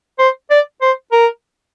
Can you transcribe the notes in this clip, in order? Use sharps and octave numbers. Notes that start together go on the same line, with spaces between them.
C5
D5
C5
A#4